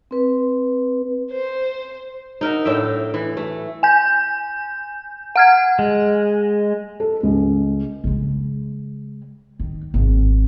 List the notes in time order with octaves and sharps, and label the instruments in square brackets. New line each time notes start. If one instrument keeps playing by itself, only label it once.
[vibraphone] C4 B4
[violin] C5
[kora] D#4 A#4 E5 F#5
A2 D4 E5 G5
E3
A3
[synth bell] G#5 G6
F#5 F6 G#6
[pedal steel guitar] G#3
[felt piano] A4
C#2
[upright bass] C#3 G#3
D#3
G#1